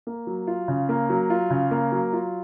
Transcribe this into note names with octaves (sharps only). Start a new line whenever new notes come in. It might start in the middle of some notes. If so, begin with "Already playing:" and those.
A#3
F#3
F4
C#3
A#3
F#3
F4
C#3
A#3
F#3
F4